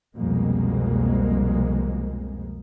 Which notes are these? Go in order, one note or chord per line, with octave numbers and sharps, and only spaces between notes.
C2 F2 B2 G#3 A#3